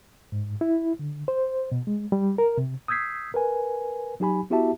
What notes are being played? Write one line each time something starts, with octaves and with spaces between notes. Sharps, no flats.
G#2
E4
D3
C5
B2
G#3
G3
A#4
C3
D#6 E6 G6 G#6 B6 C7
A#4 B4 G#5
F#3 D#4 G4 G#5 B5
B3 E4 F#4 G4 E5 A5